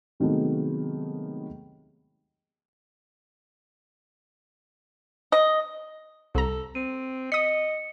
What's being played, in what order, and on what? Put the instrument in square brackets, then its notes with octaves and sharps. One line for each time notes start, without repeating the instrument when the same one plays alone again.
[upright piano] C3 D#3 F#3 G#3 A3 B3
[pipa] D#5
[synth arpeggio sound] C2 A#5 [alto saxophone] A4
[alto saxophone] C4 [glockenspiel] D#7
[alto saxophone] D#5 [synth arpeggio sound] D#6 B6 [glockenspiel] C#7